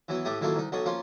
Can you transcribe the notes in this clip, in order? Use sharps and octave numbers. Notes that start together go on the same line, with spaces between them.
E3 F#3 B3
A2 A3 G4 D#6
D#3 E3 F#3 A3 A#3 F4
C2 D#4
B1 F#3 A4 D#5 C#6
F3 A#3 C#4 F4